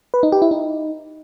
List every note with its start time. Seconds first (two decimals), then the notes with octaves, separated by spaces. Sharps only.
0.14 B4
0.23 D#4
0.32 G4
0.42 E4
0.51 D#4